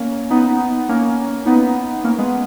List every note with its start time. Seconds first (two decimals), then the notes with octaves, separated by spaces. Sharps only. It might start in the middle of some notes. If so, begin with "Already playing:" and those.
Already playing: A#3 C#4
0.30 B3 D#4
0.89 A#3 C#4
1.46 B3 D#4
2.04 A#3 C#4
2.18 G#3 B3